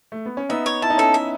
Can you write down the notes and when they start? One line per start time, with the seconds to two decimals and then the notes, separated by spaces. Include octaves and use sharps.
0.12 A3
0.26 B3
0.37 C#4
0.49 B3 D#4 E5
0.66 C#5
0.82 E4 A5
0.90 D#4
0.97 C#4 E4 A4
1.14 E5